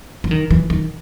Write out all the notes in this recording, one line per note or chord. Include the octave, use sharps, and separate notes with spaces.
E3
D#3
E3
D#3